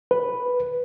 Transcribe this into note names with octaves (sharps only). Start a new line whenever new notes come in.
B4